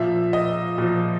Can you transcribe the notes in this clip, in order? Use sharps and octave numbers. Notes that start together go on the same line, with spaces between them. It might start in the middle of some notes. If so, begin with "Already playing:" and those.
Already playing: A#2 F3 E5
D#5
A#2 F3